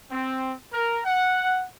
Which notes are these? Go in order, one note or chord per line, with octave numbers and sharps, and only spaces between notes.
C4
A#4
F#5